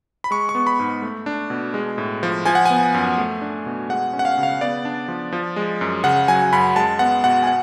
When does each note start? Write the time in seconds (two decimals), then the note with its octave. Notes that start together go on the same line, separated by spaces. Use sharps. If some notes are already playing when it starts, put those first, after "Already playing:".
0.24 B5
0.31 G#3 C#6
0.49 C#6
0.55 B3
0.67 B5
0.80 G#2
1.02 A3
1.26 D4
1.50 B2
1.74 G#3
1.98 A2
2.23 F3
2.45 F3 G#5
2.55 F#5
2.65 B3 G#5
2.94 F#2
3.18 A3
3.42 D4
3.66 B2
3.89 G#3 F#5
4.13 C#4
4.19 F#5
4.25 F5
4.38 C#3
4.43 F5
4.61 B3 D5
4.85 D4
5.08 F3
5.32 F3
5.56 G#3
5.81 F#2
6.04 C#3 F#5
6.28 F#3 G#5
6.53 F#2 B5
6.76 G#3 A5
6.99 B3 F#5
7.24 B2 F#5
7.43 G#5
7.47 F#5